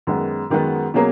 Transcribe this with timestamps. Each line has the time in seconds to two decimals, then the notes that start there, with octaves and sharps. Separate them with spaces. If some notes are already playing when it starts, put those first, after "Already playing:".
0.07 F#2 D#3 G#3 B3 F#4
0.50 F#2 D#3 G#3 B3 F#4
0.94 B2 F#3 A#3 C#4 G#4